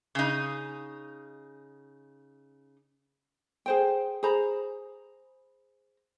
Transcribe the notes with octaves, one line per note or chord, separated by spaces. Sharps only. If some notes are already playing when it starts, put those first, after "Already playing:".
C#3 D#4
G#4 C5 G5
G#4 C5 A#5 B5